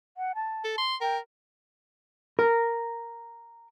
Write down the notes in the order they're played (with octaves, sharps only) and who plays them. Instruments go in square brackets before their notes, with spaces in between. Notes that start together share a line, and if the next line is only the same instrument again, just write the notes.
[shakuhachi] F#5
A5
[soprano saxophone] A4
C6
[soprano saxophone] A#4 [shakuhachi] G5
[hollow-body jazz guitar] A#4